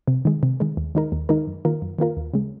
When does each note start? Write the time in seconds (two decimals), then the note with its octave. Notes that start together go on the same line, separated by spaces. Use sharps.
0.08 C3
0.25 D#3 G#3
0.43 C3
0.60 D#3 G#3
0.77 D#2
0.95 D#3 G#3 D#4 A#4
1.12 D#2
1.29 D#3 G#3 D#4 A#4
1.47 F#2
1.65 D#3 A#3 F4 A#4
1.82 F#2
1.99 D#3 A#3 F4 A#4
2.17 D#2
2.34 C#3 G#3